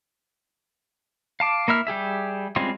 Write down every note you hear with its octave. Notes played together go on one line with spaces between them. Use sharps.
F5 A5 D6
A#3 E4 E5 F6
G3 G4 G#4 E5
G3 G#3 C4 C#4 F4